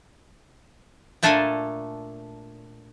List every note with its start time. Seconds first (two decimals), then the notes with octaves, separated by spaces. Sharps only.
1.23 A#2 A3 D4 A4 A#4 G#5